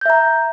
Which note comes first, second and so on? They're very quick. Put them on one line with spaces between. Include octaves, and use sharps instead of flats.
G6 E5 A#5